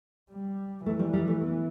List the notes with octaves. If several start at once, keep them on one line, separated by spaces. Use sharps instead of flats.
G3
E3 A3
G3
G3
A3
B3